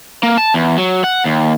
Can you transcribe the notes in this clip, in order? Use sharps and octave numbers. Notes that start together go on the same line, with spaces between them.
A#3
A5
E2
F#3
F#5
D#2